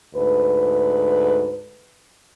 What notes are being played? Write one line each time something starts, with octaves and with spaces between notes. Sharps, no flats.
D2 G#2 B4